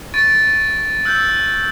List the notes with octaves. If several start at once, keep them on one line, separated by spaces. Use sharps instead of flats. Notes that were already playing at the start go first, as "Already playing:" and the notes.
C#6 A6 D7
E6 F#6 G6